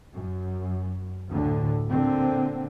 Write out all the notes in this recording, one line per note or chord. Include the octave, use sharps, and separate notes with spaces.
F#2
D2 A2 D3
A#2 D3 C4